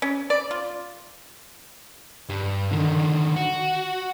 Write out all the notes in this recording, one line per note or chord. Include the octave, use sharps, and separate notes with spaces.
C#4
D5
F4
G2
D3 D#3
F#4